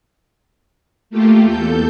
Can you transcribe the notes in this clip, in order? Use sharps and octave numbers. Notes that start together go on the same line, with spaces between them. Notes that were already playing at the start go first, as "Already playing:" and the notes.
A3 A#3 F4 G4
E2 A4 G6